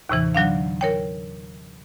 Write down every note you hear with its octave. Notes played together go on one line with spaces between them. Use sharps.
D#2 A2 C3 E3
D3 F#3 D4 F5
A#4 C#5 G5